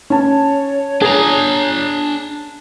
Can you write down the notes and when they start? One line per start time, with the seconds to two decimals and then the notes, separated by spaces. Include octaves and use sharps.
0.10 C#4 C#5 A5
1.02 D4 G#4 A#5